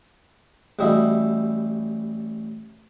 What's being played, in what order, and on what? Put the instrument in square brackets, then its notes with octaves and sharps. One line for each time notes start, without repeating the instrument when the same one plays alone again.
[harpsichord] A1 G3 E4 F#4 D#5 E5